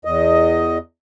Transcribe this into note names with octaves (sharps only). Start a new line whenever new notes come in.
E2 D#5